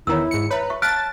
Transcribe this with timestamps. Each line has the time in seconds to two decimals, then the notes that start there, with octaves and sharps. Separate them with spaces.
0.07 E2 D#3 E4 C#5 A#5 E6
0.31 G#2 C#7
0.50 B4 C#5 E5 A#5
0.70 E5 C#6
0.82 F5 A5 F6 F#6 A6 D7